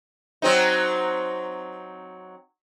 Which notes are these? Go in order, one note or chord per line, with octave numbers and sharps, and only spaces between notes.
F#3 C4 D#4